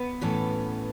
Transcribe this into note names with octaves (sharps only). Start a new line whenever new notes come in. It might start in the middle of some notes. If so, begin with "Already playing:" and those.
Already playing: B3
A2 E3 C#4 A4